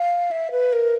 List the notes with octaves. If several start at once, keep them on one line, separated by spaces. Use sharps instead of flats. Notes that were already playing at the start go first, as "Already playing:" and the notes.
Already playing: F5
E5
B4
A#4